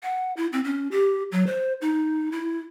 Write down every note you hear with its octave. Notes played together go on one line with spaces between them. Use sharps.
F#5
E4
C4
C#4
G4
F#3
C5
D#4
E4